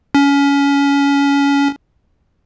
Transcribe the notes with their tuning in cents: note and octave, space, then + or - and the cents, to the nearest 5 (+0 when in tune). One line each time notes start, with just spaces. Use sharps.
C#4 +25